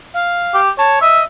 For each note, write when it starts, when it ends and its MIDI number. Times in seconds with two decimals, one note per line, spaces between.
0.14 0.60 77
0.54 0.71 67
0.78 0.98 73
0.78 0.99 81
1.02 1.24 75
1.02 1.22 76